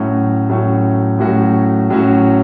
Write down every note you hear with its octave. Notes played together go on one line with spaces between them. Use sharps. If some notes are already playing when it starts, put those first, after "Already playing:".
Already playing: A2 F#3 A3 C#4 F#4
A2 F#3 A3 C#4 F#4
A2 F#3 A3 C#4 F#4
A2 F#3 A3 C#4 F#4